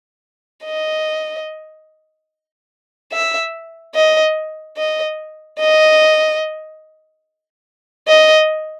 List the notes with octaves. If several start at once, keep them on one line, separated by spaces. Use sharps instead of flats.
D#5
E5
D#5
D#5
D#5
D#5